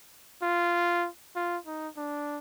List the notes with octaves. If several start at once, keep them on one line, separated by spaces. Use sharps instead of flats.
F4
F4
D#4
D4